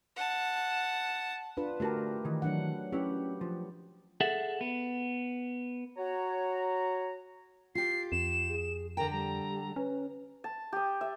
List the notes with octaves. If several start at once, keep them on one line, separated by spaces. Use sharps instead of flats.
F#5 A5
D4 F4 B4
D3 A3 F#4 G4 A#4 A5
D#3 E3
F#3 D4 F#5
C#4 E4 G4 B4
F3
G#4 A4 E5 F#5
B3
F#4 C#5 A#5
F4 G4 C7
F2 E7
G#4
D3 A#4 G5 A#5
G3 A#5
C#4 B4
A5
G4 D#6
E5